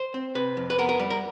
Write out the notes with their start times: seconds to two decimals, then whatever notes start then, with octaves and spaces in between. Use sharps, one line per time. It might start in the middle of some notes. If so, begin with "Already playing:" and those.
Already playing: C5
0.14 C4
0.35 C3 B4
0.57 F2
0.70 B4
0.78 B3 A#4
0.89 A#4
0.99 G3
1.10 A#4